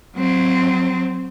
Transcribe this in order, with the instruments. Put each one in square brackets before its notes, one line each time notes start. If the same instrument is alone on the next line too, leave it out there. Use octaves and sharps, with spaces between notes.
[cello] F#3 C4